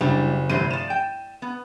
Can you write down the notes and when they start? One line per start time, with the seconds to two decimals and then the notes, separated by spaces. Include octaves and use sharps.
0.01 F#1 G3 D4 E4
0.49 F1 G2 D3 E3 C5 D#7
0.71 F3 D5 E7
0.90 G5
1.42 B3